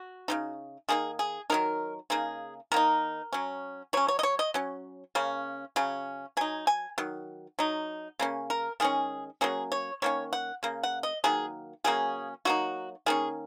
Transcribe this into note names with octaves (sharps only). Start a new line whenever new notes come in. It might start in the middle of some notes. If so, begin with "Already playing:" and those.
Already playing: F#4
C#3 F#3 D#4
D#3 A#3 D#4 G#4
G#4
D#3 F#3 D#4 A#4
C#3 A#3 D#4 G#4
D#3 A#3 D#4 A#4
F#3 C#4
F#3 C#4 C#5
C#5
D#5
C#5
D#5
F#3 C#4
C#3 A#3 C#4
C#3 F#3 C#4
F#3 D#4 G#5
G#5
D#3 F#3
F#3 D#4
C#3 A#3 C#4
A#4
D#3 G#3 C#4 G#4
F#3 A#3 C#4 G#4
C#5
D#3 A#3 C#4 C#5
F#5
C#3 A#3
F#5
D#5
D#3 F#3 A#3 G#4
C#3 F#3 A#3 C#4 G#4
F#3 A#3 D#4 F#4
D#3 A#3 C#4 G#4